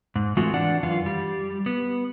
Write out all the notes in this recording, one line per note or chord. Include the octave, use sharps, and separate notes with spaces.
G#2
E3 G#3 A3 C4 F4 F#4
E3 D4 D5 F#5
F#2 E3 F4
G3
B3